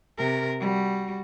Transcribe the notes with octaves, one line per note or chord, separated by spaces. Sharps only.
C3 A#4
G3 F#4